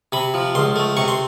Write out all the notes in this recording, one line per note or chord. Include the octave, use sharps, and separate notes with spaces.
C3 B5
F3
C#2 C6
A3
C3 C#6
C6